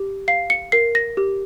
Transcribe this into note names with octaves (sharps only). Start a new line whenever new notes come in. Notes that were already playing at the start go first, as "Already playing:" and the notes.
Already playing: G4
F5 C7
C#7
A#4 C7
A#6
G4